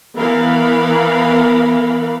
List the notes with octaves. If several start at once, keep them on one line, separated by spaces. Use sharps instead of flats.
E3 B3 A#4 F5 B5